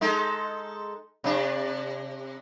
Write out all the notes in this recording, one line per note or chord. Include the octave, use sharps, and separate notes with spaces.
G#3 D#4 A4
C3 D4